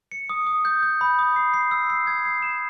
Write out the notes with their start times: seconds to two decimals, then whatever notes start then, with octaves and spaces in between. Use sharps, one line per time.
0.11 C#7
0.30 D#6
0.47 D#6
0.65 G6
0.83 G6
1.01 B5
1.19 D#6
1.36 C7
1.54 C7
1.71 E6
1.90 C7
2.07 G#6
2.25 C7
2.42 E7